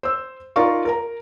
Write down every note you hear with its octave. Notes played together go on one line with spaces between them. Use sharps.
C5 E6
D#4 F4 A#4 D5 F5 C#6
A#4 A#5